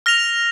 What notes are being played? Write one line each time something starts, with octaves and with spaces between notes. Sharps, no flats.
F6 A#6 F7